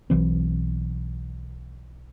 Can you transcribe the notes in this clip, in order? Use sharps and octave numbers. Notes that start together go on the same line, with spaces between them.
B1 E3 C4